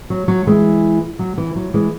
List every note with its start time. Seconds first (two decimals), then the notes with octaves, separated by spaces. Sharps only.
0.10 F#3
0.28 F#3
0.47 E3 G#3
1.19 F#3
1.38 E3
1.56 F#3
1.74 E3 G#3